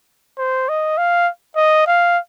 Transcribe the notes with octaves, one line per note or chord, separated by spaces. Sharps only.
C5
D#5
F5
D#5
F5